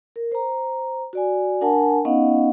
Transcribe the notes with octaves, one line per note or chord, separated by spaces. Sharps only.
A#4
C5 A#5
F#4 D5 G#5
D4 A#4 F#5 G#5 A5
B3 C#4 D#4 D#5 F5 F#5